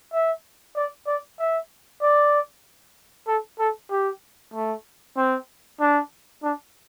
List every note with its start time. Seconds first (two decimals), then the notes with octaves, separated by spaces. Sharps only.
0.13 E5
0.76 D5
1.07 D5
1.39 E5
2.02 D5
3.27 A4
3.59 A4
3.91 G4
4.54 A3
5.17 C4
5.80 D4
6.43 D4